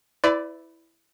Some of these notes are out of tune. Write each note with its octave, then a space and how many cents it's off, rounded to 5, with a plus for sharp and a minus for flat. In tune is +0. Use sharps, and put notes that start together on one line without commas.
E4 +0 B4 +40 D5 +0